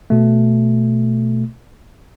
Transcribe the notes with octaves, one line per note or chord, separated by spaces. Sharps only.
B2 A3